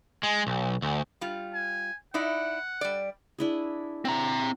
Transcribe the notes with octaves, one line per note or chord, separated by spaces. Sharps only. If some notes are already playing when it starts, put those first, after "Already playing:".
G#3
B1
D2
G3 F4
G#5
D#4 E4 D5 F#5
G3 D5
D4 E4 G#4
C4 F#5 A#5